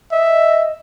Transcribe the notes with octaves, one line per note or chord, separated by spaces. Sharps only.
D#5 E5